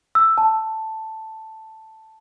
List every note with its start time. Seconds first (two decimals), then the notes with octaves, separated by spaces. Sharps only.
0.15 E6
0.38 A5